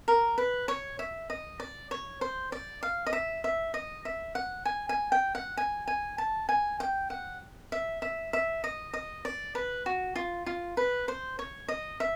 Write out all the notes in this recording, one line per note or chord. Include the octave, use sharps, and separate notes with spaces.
A#4
B4
C#5
E5
D#5
D5
C#5
C5
D5
F5
D#5
E5
E5
D#5
E5
F#5
G#5
G#5
G5
F#5
G#5
G#5
A5
G#5
G5
F#5
E5
E5
E5
D#5
D#5
D5
B4
F#4
F4
F4
B4
C5
C#5
D#5
E5